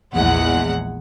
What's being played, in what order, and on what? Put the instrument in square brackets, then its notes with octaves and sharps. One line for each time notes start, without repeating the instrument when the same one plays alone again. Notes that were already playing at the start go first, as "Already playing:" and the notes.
[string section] A#1 E2 G#3 F#5